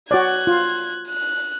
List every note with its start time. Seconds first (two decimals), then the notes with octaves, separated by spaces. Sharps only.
0.11 F#4 C#5 D5 F#6 G#6
0.47 F4
1.08 F#6